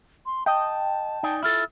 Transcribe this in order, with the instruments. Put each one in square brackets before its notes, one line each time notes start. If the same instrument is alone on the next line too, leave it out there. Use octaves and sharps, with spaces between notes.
[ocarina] C6
[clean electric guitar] D#5 [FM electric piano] G5 [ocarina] A5
[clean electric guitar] D#4 D5 G#5
[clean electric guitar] E4 F4 A4 [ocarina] E6